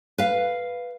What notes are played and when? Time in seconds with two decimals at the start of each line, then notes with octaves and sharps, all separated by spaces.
0.18 B4 F5